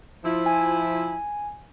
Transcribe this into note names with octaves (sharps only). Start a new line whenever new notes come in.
F3 E4
G#5